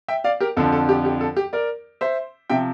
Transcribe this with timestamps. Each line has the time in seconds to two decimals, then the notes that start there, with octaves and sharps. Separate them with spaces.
0.08 E5 G5
0.24 D5 F5
0.40 G4 A#4
0.57 F2 D3 F3 A4
0.72 A4
0.89 G4
1.05 G4
1.21 A4
1.37 G4
1.53 A#4 D5
2.01 C5 E5
2.50 C3 F3 E5 G5